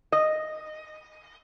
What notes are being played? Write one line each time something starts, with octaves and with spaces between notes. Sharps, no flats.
D#5